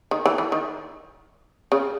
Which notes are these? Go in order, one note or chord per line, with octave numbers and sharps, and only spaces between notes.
D#3
E3
E3
D#3
C#3